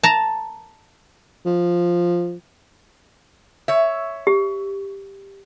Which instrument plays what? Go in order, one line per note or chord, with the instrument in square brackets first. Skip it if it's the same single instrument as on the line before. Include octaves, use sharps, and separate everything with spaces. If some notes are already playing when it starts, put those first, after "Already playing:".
[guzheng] A5 A#5
[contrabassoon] F3
[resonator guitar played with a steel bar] C#5 E5
[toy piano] G4